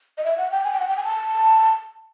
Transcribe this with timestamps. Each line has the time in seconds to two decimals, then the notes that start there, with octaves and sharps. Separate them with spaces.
0.17 D#5
0.24 E5
0.37 F#5
0.51 G5
0.64 G#5
0.72 G5
0.79 F#5
0.88 G5
0.96 G#5
1.04 A5